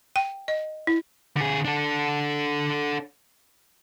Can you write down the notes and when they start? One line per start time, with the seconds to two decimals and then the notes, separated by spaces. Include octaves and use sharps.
0.16 G5
0.48 D#5
0.87 E4
1.37 D3 G#4
1.65 D4 A4